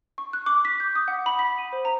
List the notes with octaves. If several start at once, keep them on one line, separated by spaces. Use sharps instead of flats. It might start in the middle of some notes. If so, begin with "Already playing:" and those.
C#6
F#6
D6
B6
G6
D#6
F#5
B5
B6
D#7
C5
A#5